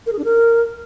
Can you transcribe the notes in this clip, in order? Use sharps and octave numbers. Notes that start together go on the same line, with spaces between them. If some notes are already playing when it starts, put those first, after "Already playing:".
A#4
G#4
D4
A#4